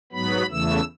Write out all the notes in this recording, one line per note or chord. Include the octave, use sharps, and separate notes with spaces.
G#2 F#3 B3 B5
E2 C#3 E3 A3 E6